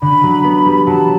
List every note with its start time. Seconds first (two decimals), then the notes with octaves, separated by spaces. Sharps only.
0.02 D3 B5
0.23 F#3
0.44 B3
0.66 G3
0.86 F#3 A5